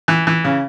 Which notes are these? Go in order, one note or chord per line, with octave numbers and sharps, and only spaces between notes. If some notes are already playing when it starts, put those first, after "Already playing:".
E3
E3
C#3